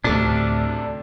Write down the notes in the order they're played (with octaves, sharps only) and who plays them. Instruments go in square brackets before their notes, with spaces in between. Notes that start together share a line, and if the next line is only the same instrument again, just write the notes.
[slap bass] D2 A2 [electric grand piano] C3 A3 [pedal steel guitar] D4